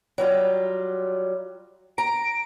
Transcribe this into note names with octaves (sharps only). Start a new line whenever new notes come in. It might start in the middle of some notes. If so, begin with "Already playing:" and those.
F#3 G3 F4
A#5 D7